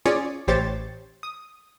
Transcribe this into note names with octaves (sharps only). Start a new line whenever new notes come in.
C#4 F4 G#4 C#5 D5
A1 G4 C5 C#5 A6
D#6